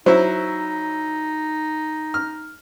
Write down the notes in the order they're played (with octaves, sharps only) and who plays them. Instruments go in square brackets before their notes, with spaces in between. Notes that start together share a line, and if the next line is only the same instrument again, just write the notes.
[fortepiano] F#3 E4 [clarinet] D#4 [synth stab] C5
[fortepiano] F6